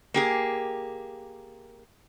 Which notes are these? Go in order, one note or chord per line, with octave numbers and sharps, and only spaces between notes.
A#3 G4 G#4